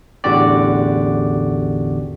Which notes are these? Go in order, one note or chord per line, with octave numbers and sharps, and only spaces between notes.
A1 E2 D3 F#4 G4 D5